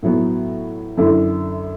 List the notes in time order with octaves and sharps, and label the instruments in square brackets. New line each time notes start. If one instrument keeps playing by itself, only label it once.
[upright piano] A2 F#3 B3
F#2 D3 A3 E4